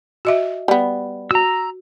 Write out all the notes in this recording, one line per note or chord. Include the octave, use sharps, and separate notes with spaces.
F#4 D#5 E5
G3 B3
F#4 A#5 E6